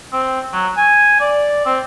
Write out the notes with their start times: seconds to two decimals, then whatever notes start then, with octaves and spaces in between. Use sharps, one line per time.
0.13 C4
0.53 F#3
0.77 G#5
1.20 D5
1.65 C4